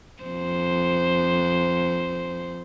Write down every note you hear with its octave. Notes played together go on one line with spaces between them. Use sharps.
F2 C5